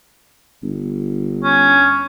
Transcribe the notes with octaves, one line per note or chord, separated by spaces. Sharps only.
G1
C#4